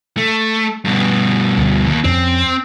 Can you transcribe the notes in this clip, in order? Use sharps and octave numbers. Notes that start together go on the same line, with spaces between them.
A3
G2 B2
D2
D#2
F2 C4 C#4